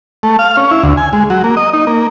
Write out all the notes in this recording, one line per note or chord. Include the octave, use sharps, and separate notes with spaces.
A3
F5
C#4
E4
D2
G#5
G#3
F#3
A#3
D#5
D#4
A#3